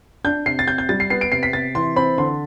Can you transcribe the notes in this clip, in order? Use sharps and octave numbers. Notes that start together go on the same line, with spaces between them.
D4 G6
C3 C7
A6
C3 G6
G6
G3 A6
C7
B3 C7
D7
C3 C7
B6
C3 A6
E3 C6
C4 B5
D3 C6